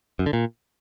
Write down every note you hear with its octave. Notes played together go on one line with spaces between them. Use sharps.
F#2
D3
A#2